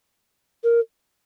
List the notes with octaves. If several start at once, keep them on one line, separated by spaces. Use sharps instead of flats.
A#4